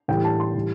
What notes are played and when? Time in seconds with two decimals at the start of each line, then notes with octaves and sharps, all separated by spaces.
0.08 A2 E3 G3 G5
0.24 A5
0.40 C6
0.55 A2 E3 G3